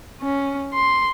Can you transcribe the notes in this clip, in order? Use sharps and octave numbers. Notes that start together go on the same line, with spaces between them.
C#4
C6